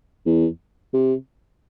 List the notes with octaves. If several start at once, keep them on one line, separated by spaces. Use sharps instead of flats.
E2
C3